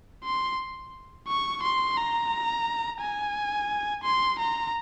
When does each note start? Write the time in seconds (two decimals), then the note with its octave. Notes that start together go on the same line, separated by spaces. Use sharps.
0.24 C6
1.27 C#6
1.62 C6
1.97 A#5
3.01 G#5
4.04 C6
4.39 A#5